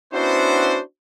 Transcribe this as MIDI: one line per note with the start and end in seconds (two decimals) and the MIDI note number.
0.12 0.79 59
0.12 0.79 61
0.12 0.79 62
0.12 0.79 64
0.12 0.79 66
0.12 0.79 72